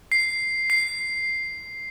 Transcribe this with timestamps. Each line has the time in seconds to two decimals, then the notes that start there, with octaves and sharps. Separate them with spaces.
0.12 C7
0.70 C7